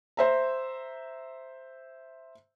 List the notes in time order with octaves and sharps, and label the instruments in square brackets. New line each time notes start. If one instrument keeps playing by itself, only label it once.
[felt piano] C5 E5 A#5